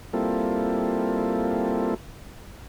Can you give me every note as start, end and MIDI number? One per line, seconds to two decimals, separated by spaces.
0.13 1.94 55
0.13 1.94 58
0.13 1.94 60
0.13 1.94 64
0.13 1.94 65
0.13 1.94 69